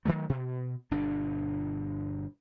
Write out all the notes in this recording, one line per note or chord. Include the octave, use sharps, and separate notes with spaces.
D#3 E3 F#3 A3
B2
G1 B2 D4